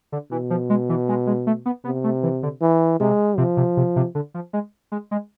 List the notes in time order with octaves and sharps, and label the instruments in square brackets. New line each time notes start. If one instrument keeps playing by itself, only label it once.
[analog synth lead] D3
[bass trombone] B2 [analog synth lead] E3
[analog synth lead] F3
G#3
E3
G#3
G#3
A3
B3
[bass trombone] C3 [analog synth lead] B3
[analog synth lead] A3
E3
D3
[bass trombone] E3
[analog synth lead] C3 [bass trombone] G#3
[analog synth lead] C3 [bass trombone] F3
[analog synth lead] C3
C3
C3
D3
F3
G#3
G#3
G#3